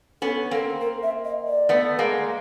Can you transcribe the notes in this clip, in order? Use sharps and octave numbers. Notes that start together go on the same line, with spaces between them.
B3 C#4 A4
A#3 C4 A4
A#4
E5
D#5
D5
A3 B3
G#3 A#3